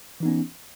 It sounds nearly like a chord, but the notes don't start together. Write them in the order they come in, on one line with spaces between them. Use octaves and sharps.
E3 D#4 B3 C#4